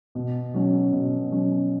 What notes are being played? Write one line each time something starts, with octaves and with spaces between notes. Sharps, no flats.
B2
F#3 C#4
B2
F#3 C#4